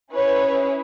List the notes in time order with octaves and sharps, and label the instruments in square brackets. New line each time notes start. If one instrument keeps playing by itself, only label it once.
[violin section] C#4 E4 G#4 B4 C#5